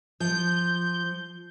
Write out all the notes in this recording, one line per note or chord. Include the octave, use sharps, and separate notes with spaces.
F3 G6